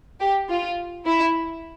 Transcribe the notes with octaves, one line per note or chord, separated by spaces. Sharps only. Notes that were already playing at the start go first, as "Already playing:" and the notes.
G4
F4
E4